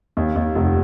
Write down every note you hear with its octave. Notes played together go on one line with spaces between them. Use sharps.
D#2
D#2
F1